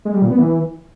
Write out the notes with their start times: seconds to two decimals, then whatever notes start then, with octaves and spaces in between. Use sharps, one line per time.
0.05 G#3
0.14 G3
0.22 A#2
0.31 B3
0.39 E3